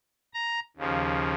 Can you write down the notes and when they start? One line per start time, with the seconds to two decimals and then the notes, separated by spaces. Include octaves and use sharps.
0.34 A#5
0.77 D#2 C#3 F3